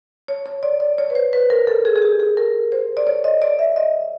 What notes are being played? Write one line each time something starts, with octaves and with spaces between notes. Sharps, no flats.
C#5
C#5
D5
D5
C#5
B4
C5
B4
A#4
A4
G#4
G#4
G4
G#4
A#4
C5
D5
C#5
D#5
D5
E5
D#5